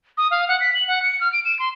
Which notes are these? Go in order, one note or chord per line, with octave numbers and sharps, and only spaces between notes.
D#6
F5
F#5
B6
F#7
F#5
C#7
F6
D7
E7
C6